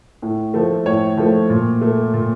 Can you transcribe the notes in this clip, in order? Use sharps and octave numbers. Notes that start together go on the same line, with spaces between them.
A2
F3 A3
A2 C#5
F3 A3
A#2
A3
A#2